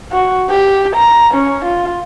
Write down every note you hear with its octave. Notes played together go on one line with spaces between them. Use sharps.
F#4
G4
A#5
C#4
F4